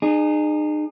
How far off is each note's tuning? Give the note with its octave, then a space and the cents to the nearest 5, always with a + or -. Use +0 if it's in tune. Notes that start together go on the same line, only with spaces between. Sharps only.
D#4 -40 G#4 +0